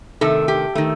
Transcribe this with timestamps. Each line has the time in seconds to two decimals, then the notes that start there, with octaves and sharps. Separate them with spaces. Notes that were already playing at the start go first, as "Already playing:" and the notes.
0.21 C3 D#3 A3 A4
0.48 G4
0.75 D#3 A3